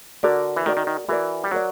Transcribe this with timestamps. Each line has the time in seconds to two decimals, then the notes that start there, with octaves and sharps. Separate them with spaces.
0.23 D3 F#4 A#4 D5
0.56 E3
0.66 D#3 F#4 A#4 D5
0.77 D#3
0.87 D#3
1.08 E3 F#4 A#4 D5
1.44 G3
1.51 F#3 F#4 A#4 D5